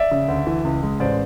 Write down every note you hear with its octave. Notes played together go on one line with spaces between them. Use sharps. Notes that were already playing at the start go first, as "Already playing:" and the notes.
Already playing: D5 E5
C#3
D2
E3
C#2
G#3
A1 C5 D5